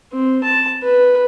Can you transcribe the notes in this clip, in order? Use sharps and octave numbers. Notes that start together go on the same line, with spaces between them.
C4
A5
B4